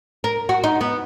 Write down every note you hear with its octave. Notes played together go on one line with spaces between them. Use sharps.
A#4
F#4
D#4
B3